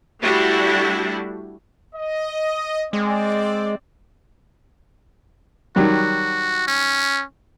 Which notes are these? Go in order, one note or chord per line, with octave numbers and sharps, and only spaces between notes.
G3 A3 D4 E4 F#4
D#5
G#3 C4 D5
D#3 F#3 G3 F#4
C#4